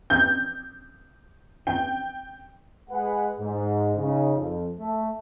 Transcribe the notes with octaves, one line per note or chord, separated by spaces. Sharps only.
G6
G5
G#3 G#4 B4 F#5
G#2
C#3 D#4
F2
A3